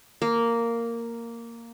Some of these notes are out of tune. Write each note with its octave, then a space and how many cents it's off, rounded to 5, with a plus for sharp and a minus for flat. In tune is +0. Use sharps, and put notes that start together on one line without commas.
A#3 -5